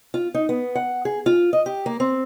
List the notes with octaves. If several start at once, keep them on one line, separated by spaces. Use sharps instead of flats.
F4
D#4
B3
F#5
G#4
F4
D#5
G4
A#3
C4